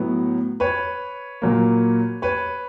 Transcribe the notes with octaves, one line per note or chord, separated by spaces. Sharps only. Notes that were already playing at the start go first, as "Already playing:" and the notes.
Already playing: A2 F#3 B3
B4 C#5
A#2 F#3 A#3
B4 C#5